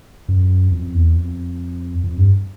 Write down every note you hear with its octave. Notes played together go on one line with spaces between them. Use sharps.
F#2
F2
E2
F2
F2
G2